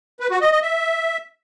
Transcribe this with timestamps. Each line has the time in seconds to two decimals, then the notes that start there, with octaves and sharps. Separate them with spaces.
0.20 B4
0.31 F#4
0.41 D#5
0.52 D#5
0.62 E5